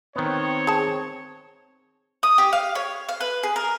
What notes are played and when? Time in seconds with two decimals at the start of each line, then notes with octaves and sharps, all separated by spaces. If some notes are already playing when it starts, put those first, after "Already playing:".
0.16 D#3 B3 C4 C#5
0.67 G#4 A5
2.23 D#6
2.38 G4
2.53 F5
2.75 C#5
3.09 F5
3.21 B4
3.43 G#4
3.56 A#4